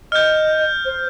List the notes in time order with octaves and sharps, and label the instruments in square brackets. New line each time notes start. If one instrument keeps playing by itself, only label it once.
[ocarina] D#5 [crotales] F6 G6
[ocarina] C5